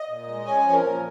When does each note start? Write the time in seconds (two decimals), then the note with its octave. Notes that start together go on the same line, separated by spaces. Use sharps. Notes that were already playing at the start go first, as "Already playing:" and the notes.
Already playing: D#5
0.09 A#2
0.27 G#3
0.45 C#4 G#5
0.64 F3
0.73 A#4
0.83 A#2